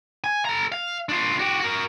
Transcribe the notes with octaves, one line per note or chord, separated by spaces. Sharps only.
G#5
A4 A#5
F5
D4 F4
F#4 G4
F#4 A#4